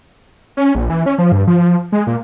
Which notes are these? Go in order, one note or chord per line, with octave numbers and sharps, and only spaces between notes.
C#4
A#1
E3
C#4
F3
G2
F3
G#3
A#2